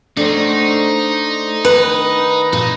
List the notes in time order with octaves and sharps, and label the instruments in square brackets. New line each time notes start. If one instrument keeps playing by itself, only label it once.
[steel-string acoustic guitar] A3 [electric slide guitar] D4 C5 [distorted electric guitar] D#4
[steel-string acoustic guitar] D#3 [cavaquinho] B4
[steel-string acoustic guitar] A#2 [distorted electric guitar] D#4